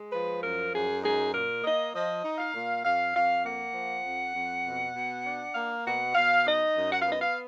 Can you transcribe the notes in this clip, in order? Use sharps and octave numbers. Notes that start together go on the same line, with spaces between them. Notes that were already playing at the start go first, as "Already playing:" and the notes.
Already playing: G#3
F3 B4
F#2 A#4
F#2 G#4
D#4 G#4
A#2 A#4
A#3 D#5
F3 D#5
D#4
F5
A#2
F2 F5
F2 F5
A#3 F#5
F3
F2
F2
B2
B2
D4
A#3 F5
B2 F#5
B2 F5
D#4 D#5
F#2
F#5
F5
B3 D#5
F5